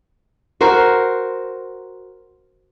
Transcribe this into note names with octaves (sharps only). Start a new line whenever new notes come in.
F#4 A#4 C5